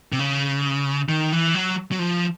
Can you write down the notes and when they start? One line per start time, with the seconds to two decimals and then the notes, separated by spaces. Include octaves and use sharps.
0.12 C3
0.19 C#3
1.09 D#3
1.32 E3
1.55 F#3
1.92 F#3
1.99 F3